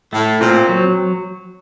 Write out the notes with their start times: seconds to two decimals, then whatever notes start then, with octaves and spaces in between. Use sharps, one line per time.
0.13 A2 A3
0.40 A#2 C4
0.69 F#3